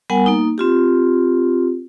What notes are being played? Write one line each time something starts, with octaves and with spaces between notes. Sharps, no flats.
G3 B3 A#4 F#5 G#5
A#3 D#4
C4 F4 G4